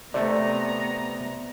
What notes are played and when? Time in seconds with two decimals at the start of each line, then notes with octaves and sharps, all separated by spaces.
0.14 C3 A3 B3 D5 A#5